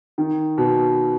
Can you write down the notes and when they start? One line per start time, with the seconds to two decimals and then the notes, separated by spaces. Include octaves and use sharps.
0.18 D#3
0.58 B2